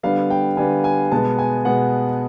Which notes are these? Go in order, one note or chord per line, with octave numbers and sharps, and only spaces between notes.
D3 G3 B3 F5
G5
D3 G3 B3 G#5
G#5
B2 G#3 B3 A5
G#5
B2 G#3 B3 F#5